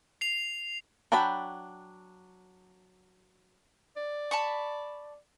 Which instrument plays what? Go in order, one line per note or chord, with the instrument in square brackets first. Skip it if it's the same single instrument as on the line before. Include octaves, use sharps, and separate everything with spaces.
[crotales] C7 F7
[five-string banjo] F#3 D4 G5 A5 B5
[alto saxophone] D5
[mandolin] A5 B5 C#6